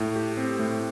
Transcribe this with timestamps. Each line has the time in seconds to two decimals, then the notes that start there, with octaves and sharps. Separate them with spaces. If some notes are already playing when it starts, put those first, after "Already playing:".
Already playing: A2
0.16 G4
0.37 C4
0.59 A2